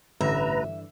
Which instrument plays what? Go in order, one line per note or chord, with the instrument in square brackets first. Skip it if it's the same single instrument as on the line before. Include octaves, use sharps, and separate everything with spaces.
[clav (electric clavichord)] A1 [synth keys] G2 D3 E3 [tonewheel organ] B4 A#5 [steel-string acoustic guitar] E5